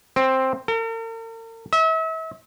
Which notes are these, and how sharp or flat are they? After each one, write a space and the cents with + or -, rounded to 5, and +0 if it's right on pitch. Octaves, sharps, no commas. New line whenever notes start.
C4 +5
A#4 -45
E5 -40